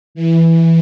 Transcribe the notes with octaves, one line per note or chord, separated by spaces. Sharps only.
E3